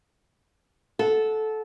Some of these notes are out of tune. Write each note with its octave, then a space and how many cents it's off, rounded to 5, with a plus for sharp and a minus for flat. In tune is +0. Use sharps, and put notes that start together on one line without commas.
A4 -15 F#5 -15